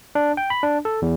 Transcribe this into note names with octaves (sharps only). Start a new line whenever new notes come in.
D4
G5
B5
D4
A4
E2